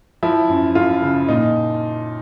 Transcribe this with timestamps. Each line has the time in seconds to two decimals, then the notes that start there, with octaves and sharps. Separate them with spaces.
0.23 F3 E4
0.49 F#2
0.75 F#2 F4
1.02 C#3
1.28 A#2 D#4